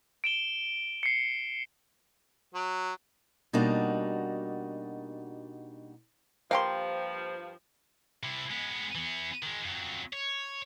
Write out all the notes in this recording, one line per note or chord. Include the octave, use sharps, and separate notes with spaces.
D7 E7 G7
C7 C#7
F#3
B2 G3 A#3 D4 D#4 F#4
G2 F3 A#3 G4 C5 F5 G5 C6
C3 E4
G#3 B3
E3 B3
D#3 G#3
F2 F#3
C#5